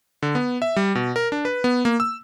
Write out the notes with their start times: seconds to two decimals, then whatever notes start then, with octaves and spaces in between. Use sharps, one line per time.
0.22 D3
0.35 B3
0.62 E5
0.76 G3
0.95 B2
1.16 A#4
1.32 D4
1.45 B4
1.64 B3
1.85 A#3
2.00 E6